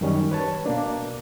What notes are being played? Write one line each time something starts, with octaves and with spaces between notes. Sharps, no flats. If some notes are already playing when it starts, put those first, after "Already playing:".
F#2 D#3 G3 C#4 C#5
B4 C#5 A5
B2 A#3 D4